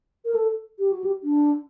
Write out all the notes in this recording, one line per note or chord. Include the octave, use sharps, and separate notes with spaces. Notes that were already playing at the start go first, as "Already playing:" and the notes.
A#4
A4
G4
F#4
G4
D4